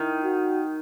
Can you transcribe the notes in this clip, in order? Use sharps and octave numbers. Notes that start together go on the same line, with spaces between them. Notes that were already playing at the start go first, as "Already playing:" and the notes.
Already playing: D#3 E4
F#4